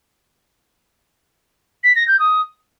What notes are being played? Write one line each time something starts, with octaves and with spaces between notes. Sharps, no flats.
B6
A#6
G6
D#6